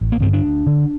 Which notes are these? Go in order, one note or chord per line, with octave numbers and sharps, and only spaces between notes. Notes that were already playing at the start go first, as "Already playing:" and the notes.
A1
A#3
G2 D3 C4
D4
D2
D3